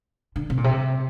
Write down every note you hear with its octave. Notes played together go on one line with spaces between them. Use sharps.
D3
C3
A#2
C3